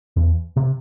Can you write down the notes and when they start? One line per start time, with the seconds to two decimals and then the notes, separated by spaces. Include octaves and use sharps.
0.16 E2
0.56 C3